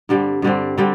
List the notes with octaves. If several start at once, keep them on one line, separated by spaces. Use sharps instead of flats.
G2 D3 G3 C4
G2 D3 G3 C4
D3 G3 C4